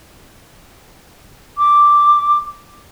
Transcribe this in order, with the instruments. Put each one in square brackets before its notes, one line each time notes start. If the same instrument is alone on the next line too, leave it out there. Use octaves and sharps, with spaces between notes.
[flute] D6